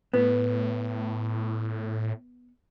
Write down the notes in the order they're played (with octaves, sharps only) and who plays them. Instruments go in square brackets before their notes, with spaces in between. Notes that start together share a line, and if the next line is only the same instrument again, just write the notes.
[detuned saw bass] A2 [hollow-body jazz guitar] B3